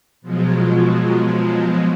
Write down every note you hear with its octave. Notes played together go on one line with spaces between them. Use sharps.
B2 F3 F#3 G#3